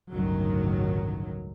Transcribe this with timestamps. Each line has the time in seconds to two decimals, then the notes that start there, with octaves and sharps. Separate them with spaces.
0.12 G1 C#2 A2 D#3 F#3